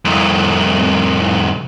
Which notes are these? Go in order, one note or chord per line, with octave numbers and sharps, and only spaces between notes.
C2 F2